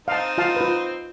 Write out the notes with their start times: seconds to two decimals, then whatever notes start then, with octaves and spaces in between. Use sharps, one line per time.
0.08 C4 D#4 F5 A5
0.38 F4 F5 A5
0.56 F4 B4